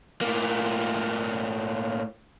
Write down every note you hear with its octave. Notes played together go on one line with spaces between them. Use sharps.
A2 A#3